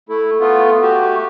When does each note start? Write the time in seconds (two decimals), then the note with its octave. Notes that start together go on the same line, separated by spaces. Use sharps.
0.09 A3 E4 A4
0.40 A3 B3 F4
0.82 A3 F#4 G4